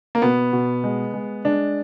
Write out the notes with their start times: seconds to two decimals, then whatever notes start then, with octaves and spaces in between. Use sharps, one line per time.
0.15 A#3
0.22 B2 B3
0.53 B2
0.84 G#3
1.14 G#3
1.45 G#3 D4